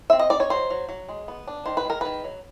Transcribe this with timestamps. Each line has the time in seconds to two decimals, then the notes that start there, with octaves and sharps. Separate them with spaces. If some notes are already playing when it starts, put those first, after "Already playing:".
0.10 C4 E5
0.19 D#5
0.30 D#4 D5
0.40 C#5
0.50 F#3 C5
0.70 F#3
0.89 F#3
1.09 G#3
1.28 B3
1.47 D4
1.66 D#3 C5
1.77 B4
1.85 G#3 A#4
2.01 D#3 B4
2.24 F#3